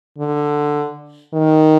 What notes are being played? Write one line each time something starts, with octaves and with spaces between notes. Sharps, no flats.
D3
D#3